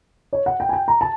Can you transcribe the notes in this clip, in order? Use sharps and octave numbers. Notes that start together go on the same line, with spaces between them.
C#5
F#5
G5
G#5
G5
A#5
A5